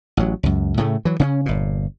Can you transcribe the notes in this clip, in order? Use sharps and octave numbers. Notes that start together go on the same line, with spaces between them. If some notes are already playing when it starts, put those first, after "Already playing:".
A1 F#3
C#2 F#2
A2 C#3 A3
E3 F#3
C#3 B3 C#4
G1 A#2